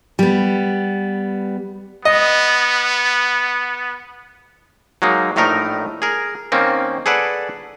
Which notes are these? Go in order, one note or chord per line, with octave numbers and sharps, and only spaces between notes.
G3 B3
B3 D#5
F#3 G#3 A#3 D#4
A#1 A2 A3 D#4 A#4
G#4 A#4
D#3 A#3 C4 C#4
G#4 A4 B4 D5 F#5